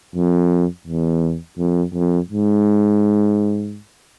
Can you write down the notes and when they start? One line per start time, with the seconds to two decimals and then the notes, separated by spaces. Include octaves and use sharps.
0.15 F2
0.87 E2
1.58 F2
1.94 F2
2.30 G#2